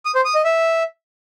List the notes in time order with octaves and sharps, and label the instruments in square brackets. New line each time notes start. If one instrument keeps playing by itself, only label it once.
[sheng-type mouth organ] D#6
C5
D#6
D#5
E5